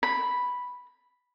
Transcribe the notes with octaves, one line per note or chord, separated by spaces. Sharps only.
B5